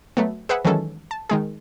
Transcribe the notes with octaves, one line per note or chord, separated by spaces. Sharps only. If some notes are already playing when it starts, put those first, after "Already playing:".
F#3 A3 B3
G#4 B4 C5 E5 F#5
D#3 E3 F#3 G#3 C#4 A4
A5
D#3 G#3 G#4